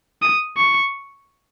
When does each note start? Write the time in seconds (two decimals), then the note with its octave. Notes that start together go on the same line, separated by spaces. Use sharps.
0.22 D#6
0.57 C#6